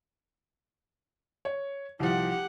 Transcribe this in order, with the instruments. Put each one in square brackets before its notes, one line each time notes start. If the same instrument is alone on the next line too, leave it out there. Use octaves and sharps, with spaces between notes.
[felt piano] C#5
[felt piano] C2 F3 [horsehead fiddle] G4 F#5